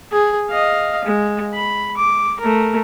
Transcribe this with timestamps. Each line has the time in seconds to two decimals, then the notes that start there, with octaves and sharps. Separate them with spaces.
0.12 G#4
0.49 D#5 F5
1.05 G#3
1.54 B5
1.97 D6
2.40 A3 A#4